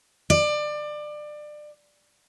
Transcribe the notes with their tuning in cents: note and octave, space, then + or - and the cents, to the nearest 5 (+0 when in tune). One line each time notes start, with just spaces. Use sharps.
D5 +25